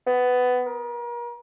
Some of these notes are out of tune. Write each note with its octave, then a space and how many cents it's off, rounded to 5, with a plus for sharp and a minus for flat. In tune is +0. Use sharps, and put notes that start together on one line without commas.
B3 +15
A#4 +35